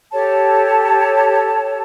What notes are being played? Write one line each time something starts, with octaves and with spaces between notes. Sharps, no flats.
G4 A4 C#5 A5